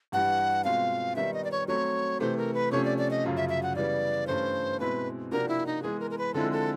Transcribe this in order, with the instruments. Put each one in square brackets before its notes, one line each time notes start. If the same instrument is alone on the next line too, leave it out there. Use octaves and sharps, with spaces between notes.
[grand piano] G2 E3 G3 [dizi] F#5
[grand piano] B2 G#3 C4 F4 [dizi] F5
[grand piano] D#3 G3 B3 D#4 [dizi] E5
[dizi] D#5
D5
C#5
[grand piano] F#3 A3 C4 [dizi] C#5
[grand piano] C3 E3 A3 [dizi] C5
[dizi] A#4
B4
[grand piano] C3 F3 A3 C#4 [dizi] C#5
[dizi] D5
D5
D#5
[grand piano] F#2 C#3 F3
[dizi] E5
E5
F#5
[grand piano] C#3 E3 G3 B3 [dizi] D5
[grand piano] G2 E3 A3 C#4 [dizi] C5
[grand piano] B2 G#3 C4 E4 [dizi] B4
[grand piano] C3 F3 A#3 D4 F#4 [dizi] A#4
[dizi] E4
D#4
[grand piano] E3 G#3 B3 [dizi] G#4
[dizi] A#4
A#4
B4
[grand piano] D3 F3 G#3 C4 E4 [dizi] A4
[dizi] A4